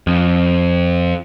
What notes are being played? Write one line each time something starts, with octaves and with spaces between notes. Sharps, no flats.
F2